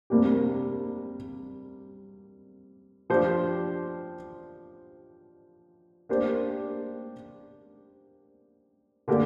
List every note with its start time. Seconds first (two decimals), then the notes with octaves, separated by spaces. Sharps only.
0.10 C3 G3 A#3 D4 G4
3.10 F3 D4 G4 C5
6.09 A#3 D4 G4 C5
9.08 D3 A#3 D4 G4